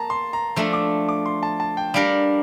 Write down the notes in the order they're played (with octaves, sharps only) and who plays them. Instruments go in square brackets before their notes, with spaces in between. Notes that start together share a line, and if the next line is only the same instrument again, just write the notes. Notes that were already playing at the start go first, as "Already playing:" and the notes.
Already playing: [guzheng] A#3 [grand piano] A5 A#5
[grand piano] C6
A#5
[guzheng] F3 A3 D4 A4
[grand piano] D6
D6
C6
A5
A5
G5
[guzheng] G3 D4 G4 A#4 [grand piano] F5